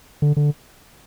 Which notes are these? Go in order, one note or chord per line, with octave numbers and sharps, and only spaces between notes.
D3
D3